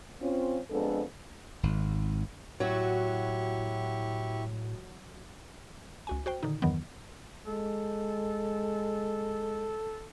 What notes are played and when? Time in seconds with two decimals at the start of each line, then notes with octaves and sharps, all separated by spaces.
0.21 C4 C#4 F4
0.71 F2 G#3 B3 D4 A4
1.63 G#1
2.60 A2 F#3 E4 F#4 G4 C#6
6.07 C#2 F#4 G#5
6.26 F#4 C5 G5
6.43 A#2 D3 D#3 D#4
6.62 E2 G2 D#3 E3 F#3 B3
7.47 G#3 A4